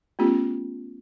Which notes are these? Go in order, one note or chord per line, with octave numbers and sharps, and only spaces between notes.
A3 B3 C#4 F4 G4